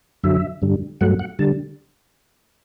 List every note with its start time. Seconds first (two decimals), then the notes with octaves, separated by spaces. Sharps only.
0.23 F#2 D3 F#3 E5
0.62 G2 D3 G3
1.01 G2 F#3 A3 F#5
1.19 F#5
1.39 D3 G3 A5